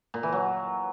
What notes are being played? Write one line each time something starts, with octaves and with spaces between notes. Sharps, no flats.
A#2
E3
F#3